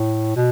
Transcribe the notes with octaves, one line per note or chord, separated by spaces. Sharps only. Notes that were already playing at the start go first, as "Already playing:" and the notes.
Already playing: A2
B2